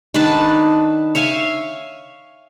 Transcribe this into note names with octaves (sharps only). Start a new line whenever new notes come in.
D#3 D4 B4 A5
C#5 E5 F5 G#5